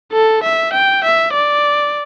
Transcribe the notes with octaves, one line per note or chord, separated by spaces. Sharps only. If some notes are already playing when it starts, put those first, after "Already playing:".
A4
E5
G5
E5
D5